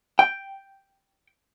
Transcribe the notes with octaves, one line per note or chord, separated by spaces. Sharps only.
G5